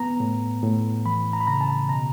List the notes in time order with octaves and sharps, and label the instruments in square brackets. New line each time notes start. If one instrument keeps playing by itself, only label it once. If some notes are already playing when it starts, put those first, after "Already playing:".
Already playing: [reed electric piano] B3 A#5
A2
A2
E3 B5
A#5
B5
C#3 A#5
A5
B2 A#5